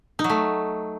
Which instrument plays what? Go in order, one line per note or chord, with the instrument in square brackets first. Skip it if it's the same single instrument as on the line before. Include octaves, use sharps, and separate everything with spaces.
[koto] D#4
F#3
A3